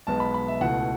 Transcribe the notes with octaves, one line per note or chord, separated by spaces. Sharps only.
B1 B2 G#3 B3 A5
B5
B5
E5
C#2 B2 A3 E4 F#5